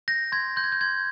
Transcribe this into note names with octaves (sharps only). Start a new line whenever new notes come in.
G6 A#6
C6 G#6
C6 G6
G#6
G6
C6 G#6